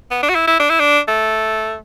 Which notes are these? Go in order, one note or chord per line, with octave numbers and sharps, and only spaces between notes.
B3
D4
F#4
E4
E4
D4
E4
D4
A3